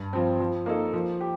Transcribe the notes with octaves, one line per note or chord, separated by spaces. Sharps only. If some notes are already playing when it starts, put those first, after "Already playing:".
Already playing: G2
F3 C4
F3
A#3 D#4 A4
F3
G4